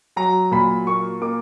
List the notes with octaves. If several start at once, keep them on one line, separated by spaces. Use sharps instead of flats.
F#3 A#5
A#2 B5
A#3 C#6
A#3 D6